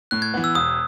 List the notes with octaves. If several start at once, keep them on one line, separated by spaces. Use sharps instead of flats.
A2 F#6
G#6
E3 B3
E6
E1 D#6